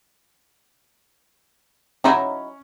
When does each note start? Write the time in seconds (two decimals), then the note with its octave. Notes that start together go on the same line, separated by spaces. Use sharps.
2.04 F#3 C#4 D#4 E4